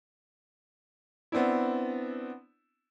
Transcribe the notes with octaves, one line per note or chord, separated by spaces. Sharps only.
B3 C4 D4 E4